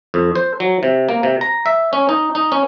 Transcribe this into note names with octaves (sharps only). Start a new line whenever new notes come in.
F2
C5
F#3
C3
A#3
C3
A#5
E5
C#4
D#4
D#4
C#4